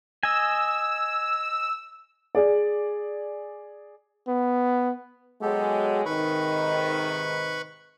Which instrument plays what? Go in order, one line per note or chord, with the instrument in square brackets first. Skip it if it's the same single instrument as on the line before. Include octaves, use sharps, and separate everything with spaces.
[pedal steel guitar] D#5 G#5 [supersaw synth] E6
[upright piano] G#4 D5
[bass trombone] B3
[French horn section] F#3 G#3 [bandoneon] B3 G4 A4
[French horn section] G#2 C3 D#3 [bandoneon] B4 B5 C#6